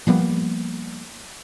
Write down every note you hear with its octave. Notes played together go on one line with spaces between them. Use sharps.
F3 G3 A#3 B3